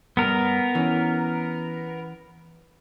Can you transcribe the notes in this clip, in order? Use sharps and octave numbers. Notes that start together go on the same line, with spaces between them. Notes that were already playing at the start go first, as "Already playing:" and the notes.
G2 B3 A#4
E3 C#4